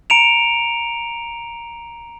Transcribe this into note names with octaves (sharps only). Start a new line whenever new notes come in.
A#5 C#7 D7 E7 F7